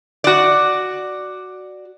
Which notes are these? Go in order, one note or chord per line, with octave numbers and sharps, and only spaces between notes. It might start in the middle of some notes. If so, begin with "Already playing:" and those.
F#4 D5